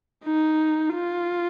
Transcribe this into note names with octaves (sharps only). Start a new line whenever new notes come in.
D#4
F4